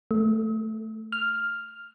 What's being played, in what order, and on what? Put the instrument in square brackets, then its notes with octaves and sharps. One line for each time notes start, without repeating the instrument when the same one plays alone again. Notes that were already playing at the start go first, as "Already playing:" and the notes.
[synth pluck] A3
F6